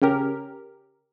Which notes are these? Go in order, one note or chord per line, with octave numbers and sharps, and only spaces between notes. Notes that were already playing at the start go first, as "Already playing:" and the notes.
C#3 C#4 G4 A#4